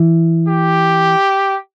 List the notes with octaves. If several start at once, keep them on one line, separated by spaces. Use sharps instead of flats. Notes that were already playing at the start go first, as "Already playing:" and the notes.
Already playing: E3
G4